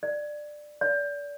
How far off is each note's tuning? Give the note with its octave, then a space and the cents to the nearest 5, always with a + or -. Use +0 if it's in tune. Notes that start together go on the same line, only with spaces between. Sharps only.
D5 +15
D5 -30